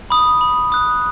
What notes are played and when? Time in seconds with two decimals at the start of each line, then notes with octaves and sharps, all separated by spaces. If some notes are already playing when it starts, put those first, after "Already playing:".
0.10 B5 D#6
0.41 B5
0.72 D#6 F#6